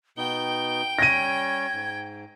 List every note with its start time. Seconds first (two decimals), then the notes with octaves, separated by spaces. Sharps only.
0.17 B2 B3 D#4 G5 G7
0.99 G3 C#4 C#5 G#6 A#6 D#7
1.74 G#2